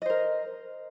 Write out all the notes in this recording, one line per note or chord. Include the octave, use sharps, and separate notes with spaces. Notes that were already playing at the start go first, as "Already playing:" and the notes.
A#4 C5 D#5